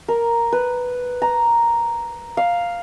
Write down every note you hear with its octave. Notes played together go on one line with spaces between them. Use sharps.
A#4
B4
A#5
F5